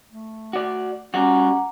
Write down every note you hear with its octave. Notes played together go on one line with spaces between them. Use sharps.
A3
F#4 D5
G3 C#4 F4 F#4 F#5 A#5 D6